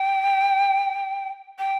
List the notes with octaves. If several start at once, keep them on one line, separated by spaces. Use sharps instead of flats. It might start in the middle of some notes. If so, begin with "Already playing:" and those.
Already playing: G5
G5